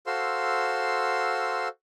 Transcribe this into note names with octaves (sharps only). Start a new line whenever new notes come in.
F#4 A4 C5 F5 C6 E6